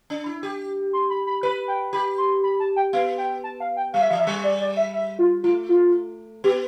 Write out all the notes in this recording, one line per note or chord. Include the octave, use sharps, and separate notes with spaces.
D4
E4
G4
C6
B5
B5
B4 B5
G5
G4 B5
C6
B5
A5
G5
B3 F5
G5
A5
F5
G5
G3 F5
E5
F3 F5
E5
G3
D5
D5
E5
E5
F4
A3 F4
F4
B3 G4